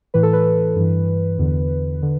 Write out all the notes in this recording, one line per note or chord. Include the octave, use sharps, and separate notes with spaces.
A2 E3 B4
A4
B4
G2 E3
E2 D3
D3